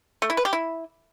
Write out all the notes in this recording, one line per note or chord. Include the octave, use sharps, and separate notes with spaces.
A3
E4
B4
G4
E4